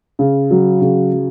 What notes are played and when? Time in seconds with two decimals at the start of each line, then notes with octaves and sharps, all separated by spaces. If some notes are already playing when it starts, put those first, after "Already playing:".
0.19 C#3
0.51 F#3
0.81 C#3
1.13 F#3